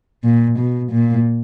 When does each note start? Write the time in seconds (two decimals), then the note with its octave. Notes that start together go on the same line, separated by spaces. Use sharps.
0.24 A#2
0.58 B2
0.91 A#2